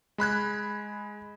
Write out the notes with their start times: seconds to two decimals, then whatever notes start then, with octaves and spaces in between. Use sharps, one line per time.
0.18 G#3 B5 F#6 G#6